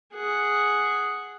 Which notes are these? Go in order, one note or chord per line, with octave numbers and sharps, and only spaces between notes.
G#4 F#5